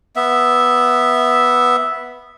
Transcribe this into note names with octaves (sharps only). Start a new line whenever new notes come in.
B3 E5